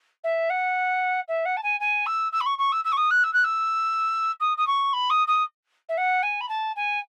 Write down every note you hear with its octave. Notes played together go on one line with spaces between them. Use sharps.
E5
F#5
E5
F#5
A5
G#5
G#5
E6
E6
B5
C#6
C#6
E6
E6
C#6
D#6
F#6
E6
F#6
E6
D#6
D#6
C#6
B5
D#6
D#6
E5
F#5
G#5
B5
A5
G#5